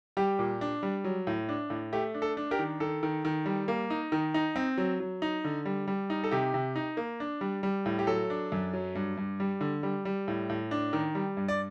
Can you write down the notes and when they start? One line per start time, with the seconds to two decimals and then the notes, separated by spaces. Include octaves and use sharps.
0.17 G3 G4
0.39 A#2
0.61 D4
0.83 G3
1.04 F#3
1.27 A2
1.49 D4
1.70 A2
1.93 A3 G4
2.14 D4
2.22 A4
2.37 D4
2.51 G4 A#4
2.59 D#3
2.80 D#3 A4
3.03 D#3
3.25 D#3
3.46 G3
3.68 A#3
3.90 D#4
4.12 D#3
4.34 D#4
4.56 C4
4.78 F#3
5.00 F#3
5.22 D#4
5.44 D3
5.65 G3
5.88 G3
6.10 D#4
6.24 A4
6.31 C3 G4
6.54 C3
6.76 D#4
6.97 A#3
7.20 D4
7.41 G3
7.63 G3
7.86 A2
7.99 G4
8.07 F#3 A4
8.30 D4
8.52 F#2
8.73 F#3
8.95 G2
9.17 G2
9.40 G3
9.61 D3
9.83 G3
10.05 G3
10.28 A2
10.50 A2
10.71 D4
10.93 D#3
11.15 G3
11.37 G2
11.48 D5